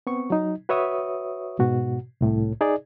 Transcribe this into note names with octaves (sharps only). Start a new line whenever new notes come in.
B3 C4 C#6
F#3 D#4
F#4 B4 C#5 E5 C#6 D#6
G#2 B2 F#4
C2 A2
D#4 G#4 D5